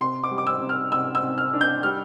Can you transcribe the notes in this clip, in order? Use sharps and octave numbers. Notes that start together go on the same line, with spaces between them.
C3 C6
D6
G3
D6
E6
C3
F6
C3 E6
E6
C3
F6
D4
G6
G3 F6